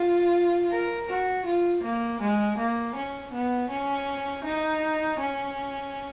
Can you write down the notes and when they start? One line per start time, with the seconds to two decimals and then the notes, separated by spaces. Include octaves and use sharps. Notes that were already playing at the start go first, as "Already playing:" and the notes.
Already playing: F4
0.71 A#4
1.08 F#4
1.45 F4
1.83 A#3
2.21 G#3
2.58 A#3
2.95 C#4
3.32 B3
3.70 C#4
4.44 D#4
5.19 C#4